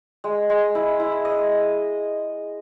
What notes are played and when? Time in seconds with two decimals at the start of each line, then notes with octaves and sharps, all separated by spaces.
0.24 G#3
0.50 G#3
0.75 E4
1.00 E4
1.25 D#5